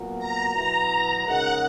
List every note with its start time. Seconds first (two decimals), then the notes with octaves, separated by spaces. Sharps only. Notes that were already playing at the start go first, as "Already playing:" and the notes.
Already playing: A#2 F#3 B3 F#4 A#4
0.19 A#5
0.54 B2 F#3 B3 E4 B4 A#5
1.26 C#3 G#3 D#4 A#4 F#5